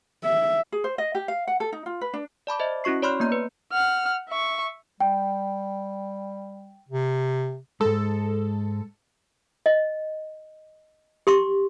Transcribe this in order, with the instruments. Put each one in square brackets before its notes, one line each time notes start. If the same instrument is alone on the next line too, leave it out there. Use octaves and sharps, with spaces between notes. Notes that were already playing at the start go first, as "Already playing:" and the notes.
[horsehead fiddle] E5
[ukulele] G#4
C5
D#5
G4
F5
F#5
A4
D#4
F4
B4
D4
[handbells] D5 A5 B5 D6
C5 D#5 E5
C#4 E4 F#4 C#6 C7
C#5 D5 B5 C6 F6 F#6
A#3 B3 A#5 G6
B4
[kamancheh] F#5 F6
E5 C#6
[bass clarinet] G3 [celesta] G5
[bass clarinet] C3
[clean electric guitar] G#2 G#3 [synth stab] A4
[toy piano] D#5
G4 C6 C#6